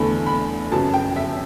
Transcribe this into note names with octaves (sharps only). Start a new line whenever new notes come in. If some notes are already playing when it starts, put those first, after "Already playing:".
Already playing: E2 D3 A3 B5
B5
F#2 C#3 F#3 B3 A5
G5
E5